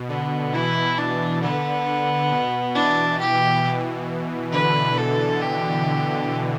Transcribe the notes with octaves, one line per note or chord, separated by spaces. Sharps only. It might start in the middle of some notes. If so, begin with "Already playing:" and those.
Already playing: B2
D3 B3
B2 E3 E4
D4
D3 B3
D3
B2
B2 E3 D4
G4
B2 E3
D3 B4
A4
G4